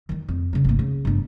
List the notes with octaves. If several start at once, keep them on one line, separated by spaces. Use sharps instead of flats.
D#3 E3
F2
C#3 C#4
G#1 A#3
C#3
G1 D4